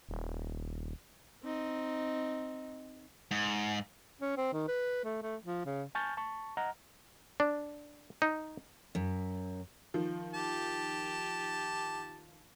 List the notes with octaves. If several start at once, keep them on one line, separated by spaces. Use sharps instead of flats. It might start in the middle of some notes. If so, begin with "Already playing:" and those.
D#1
C4 D#4
G#2
C#4
C4
D#3
B4
A3
A3
F3
C#3
G#5 A5 C#6 F6 G6 A6
A5 C#6
D#5 F#5 A#5 F6
D4
D#4
F#2
D#3 F3
G4 A5